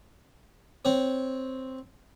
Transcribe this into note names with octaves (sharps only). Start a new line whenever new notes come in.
C4 C#5